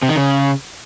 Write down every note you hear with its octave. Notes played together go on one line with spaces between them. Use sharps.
C3
D#3
C#3